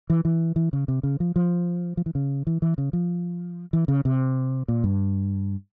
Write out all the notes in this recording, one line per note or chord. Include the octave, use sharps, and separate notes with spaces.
E3
E3
E3
C#3
C3
C#3
F3
F3
F3
E3
C#3
E3
E3
C#3
F3
E3
C#3
C3
A#2
G2